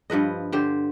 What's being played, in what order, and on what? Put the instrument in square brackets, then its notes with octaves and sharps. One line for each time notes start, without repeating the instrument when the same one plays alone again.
[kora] G2 F3 B4 D#5
D3 G4 C5